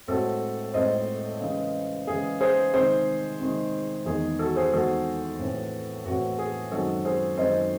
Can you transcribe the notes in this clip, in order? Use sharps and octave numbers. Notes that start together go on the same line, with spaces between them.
A2 G#3 C4 F#4 A4
A2 G#3 C4 C5 D#5
C#3 E3 G#3
C#3 E3 G#3 G#4
G#4 C5
C3 D#3 G#3 G#4 C5
C3 D#3 G#3
E2 D#3 G#3 G#4
F#4 A4
G#4 C5
E2 D#3 G#3 F#4 A4
A2 E3 C4
A2 E3 C4 F#4
G#4
F#2 D#3 G#3 C4 F#4 A4
G#4 C5
F#2 D#3 G#3 C4 C5 D#5